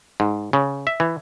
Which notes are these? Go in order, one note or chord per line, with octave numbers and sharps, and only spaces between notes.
G#2
C#3
E5
E3